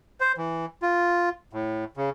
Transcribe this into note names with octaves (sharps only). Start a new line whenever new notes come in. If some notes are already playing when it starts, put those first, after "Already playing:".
C5
E3
F4
A2
C#3